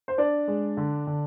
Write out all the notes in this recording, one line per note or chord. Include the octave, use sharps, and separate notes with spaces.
C5
D4 D5
G#3
D3
D3